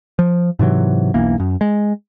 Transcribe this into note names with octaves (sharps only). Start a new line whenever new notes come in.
F3
G#2 C3 E3 F#3
E1 B1 E3 A#3
F#2
G#3